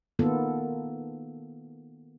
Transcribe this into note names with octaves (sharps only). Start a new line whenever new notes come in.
D#3 A#3 B3 F4 A4